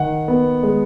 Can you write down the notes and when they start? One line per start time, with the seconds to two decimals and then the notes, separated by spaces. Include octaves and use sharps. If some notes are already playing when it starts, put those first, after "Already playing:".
Already playing: D#3 F#5
0.28 B3
0.63 G#3